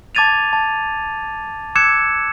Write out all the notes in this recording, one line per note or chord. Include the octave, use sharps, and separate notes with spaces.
A5 D6 G#6 A6 D#7 F7
A5
D6 E6 F#6 G#6 C#7 E7